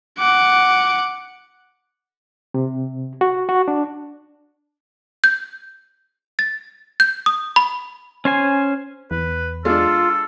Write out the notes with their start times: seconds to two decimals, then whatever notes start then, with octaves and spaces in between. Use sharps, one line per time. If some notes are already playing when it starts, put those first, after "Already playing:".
0.19 F#5 D6
2.54 C3
3.21 F#4
3.49 F#4
3.68 D4
5.24 G6
6.39 A6
7.00 G6
7.26 D#6
7.56 B5
8.25 C#4 C5 G#5
9.11 E2 B4
9.65 G#3 D4 F4 A4